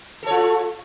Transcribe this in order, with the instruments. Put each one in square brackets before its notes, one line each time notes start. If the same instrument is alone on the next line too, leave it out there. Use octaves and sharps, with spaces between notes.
[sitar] A4
C#5
F4